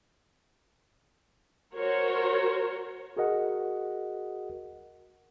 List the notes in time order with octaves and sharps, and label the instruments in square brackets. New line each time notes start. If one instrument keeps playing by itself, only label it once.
[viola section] F#4 A#4 C5 C#5
[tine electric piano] F#4 G#4 A#4 D#5 F#5